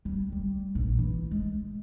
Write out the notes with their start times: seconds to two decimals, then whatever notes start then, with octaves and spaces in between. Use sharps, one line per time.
0.05 G3
0.32 G3
0.75 A#1
0.98 E3
1.31 G#3